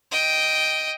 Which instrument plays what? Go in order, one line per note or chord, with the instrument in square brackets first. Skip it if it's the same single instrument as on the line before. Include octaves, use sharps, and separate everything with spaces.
[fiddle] D#5 G5